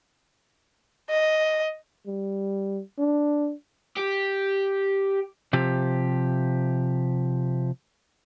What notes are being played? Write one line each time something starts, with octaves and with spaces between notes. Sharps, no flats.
D#5
G3
D4
G4
C3 F3 G4